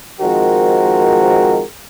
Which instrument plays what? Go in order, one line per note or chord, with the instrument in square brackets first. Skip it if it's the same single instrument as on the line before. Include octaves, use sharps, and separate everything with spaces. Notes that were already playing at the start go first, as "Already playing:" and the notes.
[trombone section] D#3 F3 G#3 C4 F#4 A#4